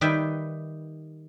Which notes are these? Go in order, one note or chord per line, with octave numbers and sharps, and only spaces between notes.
D#3 G3 B4 E5 G5